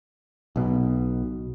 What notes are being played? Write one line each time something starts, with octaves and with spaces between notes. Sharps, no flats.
B1 B2